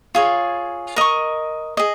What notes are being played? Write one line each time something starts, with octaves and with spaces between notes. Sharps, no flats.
F4 G#4 C#5
A#4 D#5 C#6
G#4 D#5